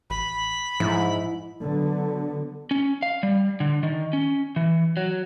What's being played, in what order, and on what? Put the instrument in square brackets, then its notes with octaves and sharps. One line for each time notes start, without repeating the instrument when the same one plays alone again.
[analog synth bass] A1 [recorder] B5
[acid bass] G#2 [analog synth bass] F3 [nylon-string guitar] E4
[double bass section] D3 F#3 B3
[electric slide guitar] C#4
F5
G3
D3
D#3
C#4
E3
F#3